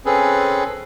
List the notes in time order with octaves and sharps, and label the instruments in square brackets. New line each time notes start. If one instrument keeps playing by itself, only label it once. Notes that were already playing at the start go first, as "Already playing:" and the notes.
[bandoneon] C4 C#4 G#4 A4 B4